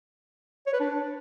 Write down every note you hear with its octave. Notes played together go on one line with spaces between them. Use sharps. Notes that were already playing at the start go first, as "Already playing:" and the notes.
C#5
B4
D4